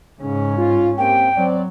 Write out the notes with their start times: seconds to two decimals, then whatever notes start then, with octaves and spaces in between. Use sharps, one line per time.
0.21 G#2 C#3 C#4
0.57 F4
0.98 A#3 C4 G4 G5
1.37 F#3 C4 D5